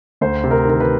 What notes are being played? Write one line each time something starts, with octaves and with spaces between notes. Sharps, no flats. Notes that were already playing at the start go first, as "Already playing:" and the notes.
D2 C5
C3
A#4
D#3 A#4
B4